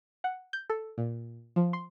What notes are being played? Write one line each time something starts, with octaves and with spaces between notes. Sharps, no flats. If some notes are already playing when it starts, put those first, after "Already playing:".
F#5
G6
A4
A#2
F3
C6